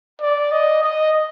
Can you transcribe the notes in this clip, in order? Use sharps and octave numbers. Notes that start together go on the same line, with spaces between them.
D5
D#5
D#5